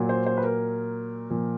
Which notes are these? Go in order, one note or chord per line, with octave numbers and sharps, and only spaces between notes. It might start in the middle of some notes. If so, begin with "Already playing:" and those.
Already playing: A#2 F#3
C5
C5
B4
A#4
A#2 F3